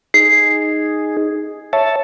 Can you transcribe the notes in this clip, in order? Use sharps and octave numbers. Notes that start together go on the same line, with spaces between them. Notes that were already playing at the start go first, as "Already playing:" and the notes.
D#4 G#4 C7
C#5 E5 A5